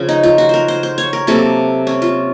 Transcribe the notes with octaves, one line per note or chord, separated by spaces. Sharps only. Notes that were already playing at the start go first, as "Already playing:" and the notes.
Already playing: C#3 F3 C#4
D#4
F4
F#4
A#4 C5
C5
C5
C#5
A#4
C3 F#3 A#3 A4
C#4
F4